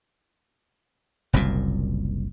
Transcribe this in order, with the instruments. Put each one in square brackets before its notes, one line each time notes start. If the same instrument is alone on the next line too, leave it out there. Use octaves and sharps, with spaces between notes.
[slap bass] F#1 C2 F#2 A#2